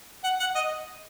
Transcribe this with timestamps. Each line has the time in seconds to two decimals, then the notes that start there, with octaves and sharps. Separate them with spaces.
0.24 F#5
0.40 F#5
0.55 D#5